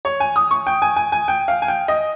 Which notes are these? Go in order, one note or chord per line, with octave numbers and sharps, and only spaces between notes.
C#5
G#5
D#6
C#6
G5
G#5
G#5
G#5
G5
F5
G#5
G5
D#5